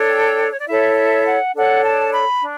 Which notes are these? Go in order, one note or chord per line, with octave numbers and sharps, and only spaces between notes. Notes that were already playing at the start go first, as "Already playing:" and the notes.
Already playing: D4 A4 C#5
G5
C#5
D5
E4 A4 C#5 E5
E5
F#5
D4 A4 C#5 F#5
A5
B5
D4